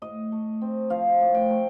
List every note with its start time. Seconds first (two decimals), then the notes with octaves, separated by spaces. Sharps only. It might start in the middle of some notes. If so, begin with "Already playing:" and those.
0.02 A2 D#5
0.32 A3
0.61 C4
0.90 F3 F5
1.21 A2
1.35 G5
1.50 A3